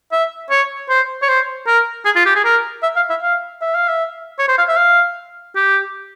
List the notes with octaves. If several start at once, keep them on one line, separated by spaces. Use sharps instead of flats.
E5
C#5
C5
C#5
C5
A#4
G#4
F4
G4
G#4
A#4
E5
F5
E5
F5
E5
F5
E5
C#5
C5
F5
E5
F5
G4